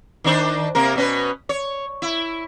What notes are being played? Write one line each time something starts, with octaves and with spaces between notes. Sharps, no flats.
D#3 D4 C5
C3 A#3 A#4
B2 C#4 B4
C#5
E4